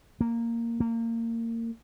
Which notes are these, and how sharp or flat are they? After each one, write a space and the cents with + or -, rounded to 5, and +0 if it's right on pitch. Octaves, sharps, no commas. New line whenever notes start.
A#3 -10
A#3 -25